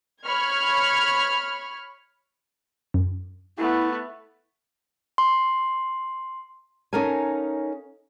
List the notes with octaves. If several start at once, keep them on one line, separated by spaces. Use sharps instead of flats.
C#5 B5 C#6 F6 G#6
F#2
A3 B3 E4
C6
C#4 D#4 A4 A#4 F5 G#5